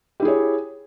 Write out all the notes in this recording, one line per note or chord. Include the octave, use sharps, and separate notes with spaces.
E4 G4 G#4 C#5